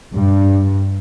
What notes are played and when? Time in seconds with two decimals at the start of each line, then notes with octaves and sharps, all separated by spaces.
0.14 G2